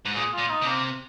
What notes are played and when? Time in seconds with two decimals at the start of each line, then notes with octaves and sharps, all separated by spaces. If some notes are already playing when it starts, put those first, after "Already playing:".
0.05 G#2
0.15 A#2 G#4
0.33 A#2 F4
0.50 D#4
0.62 C3 A#3